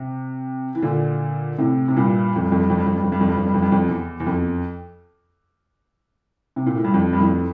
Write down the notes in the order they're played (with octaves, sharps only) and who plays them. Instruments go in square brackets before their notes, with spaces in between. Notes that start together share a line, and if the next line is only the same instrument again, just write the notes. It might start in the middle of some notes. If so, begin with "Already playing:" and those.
Already playing: [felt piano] C3
E3
A#2 D3
A2 C3
C3
G2 A#2
F2
G2
F2
G2
F2
G2
F2
G2
F2
G2
F2
G2
F2
G2
F2
G2
F2
E2
E2
F2
C3
A#2
A2
G2
F2
G2
F2 A2